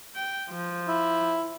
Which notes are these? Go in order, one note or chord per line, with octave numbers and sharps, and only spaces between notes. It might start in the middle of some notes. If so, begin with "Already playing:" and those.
G5
F3
E4